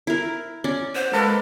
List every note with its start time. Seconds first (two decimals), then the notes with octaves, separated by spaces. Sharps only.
0.07 E4 A#4
0.64 C#4 D5
0.95 C5 F#5
1.13 G#3 A#3 A4 B4